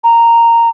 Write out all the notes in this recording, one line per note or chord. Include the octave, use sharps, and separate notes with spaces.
A#5